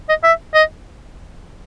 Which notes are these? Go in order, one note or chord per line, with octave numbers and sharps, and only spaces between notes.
D#5
E5
D#5